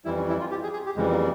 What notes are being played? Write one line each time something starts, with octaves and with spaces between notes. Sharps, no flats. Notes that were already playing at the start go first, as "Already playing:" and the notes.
F2 E3 G3 E4
C#4
E4
F4
G4
G#4
G#4
G4
F2 C#3 E3 G3 G#3
A#3